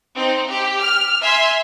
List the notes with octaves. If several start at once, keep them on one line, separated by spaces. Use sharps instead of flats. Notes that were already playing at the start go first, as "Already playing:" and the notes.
C4 D#4
G4
F6
E5 G#5 C6